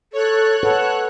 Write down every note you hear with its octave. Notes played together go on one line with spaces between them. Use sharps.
A4 C#5 F#6
A4 B4 F#5